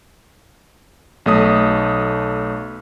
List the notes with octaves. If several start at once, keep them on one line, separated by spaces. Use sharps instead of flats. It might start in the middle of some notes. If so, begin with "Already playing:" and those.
B1 A3 D#6